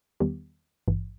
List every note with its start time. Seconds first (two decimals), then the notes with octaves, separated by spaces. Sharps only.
0.20 E2 D#3 G3 B3 G4
0.88 G#1 G2 E3